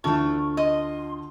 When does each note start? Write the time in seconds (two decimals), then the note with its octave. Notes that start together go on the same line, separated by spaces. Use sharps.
0.04 D2 D3 E3 A3 F4 A5 C#6
0.57 D#5 C6